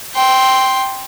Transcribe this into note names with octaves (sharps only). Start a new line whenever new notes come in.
G5 C6